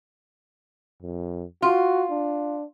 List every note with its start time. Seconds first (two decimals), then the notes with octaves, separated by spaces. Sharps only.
1.02 F2
1.62 F4 F#4
2.11 D4